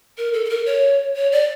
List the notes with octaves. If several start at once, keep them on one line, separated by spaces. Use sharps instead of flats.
A#4
A4
A4
A#4
C#5
C#5
D5